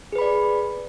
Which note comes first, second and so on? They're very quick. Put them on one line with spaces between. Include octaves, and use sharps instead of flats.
G#4 B4 B5 D5